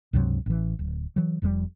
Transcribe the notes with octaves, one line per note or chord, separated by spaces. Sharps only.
C#2 G2 C3 F#3
A1 E3
D1
E3 F#3
F1 F2 G#2 G3